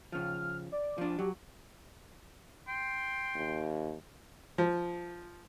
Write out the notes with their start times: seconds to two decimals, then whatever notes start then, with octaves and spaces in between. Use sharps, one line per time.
0.12 C#3 F3 F6
0.72 D5
0.98 F3 D4
1.19 F#3 G4
2.68 G5 C6
3.36 D#2
4.58 F3